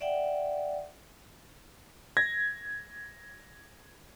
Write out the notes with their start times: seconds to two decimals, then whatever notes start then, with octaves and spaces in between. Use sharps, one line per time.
0.01 D5 E5 F#5 G5
2.17 G#6 A#6